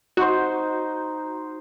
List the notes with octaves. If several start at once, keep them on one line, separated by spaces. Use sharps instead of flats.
D#4 F#4 C5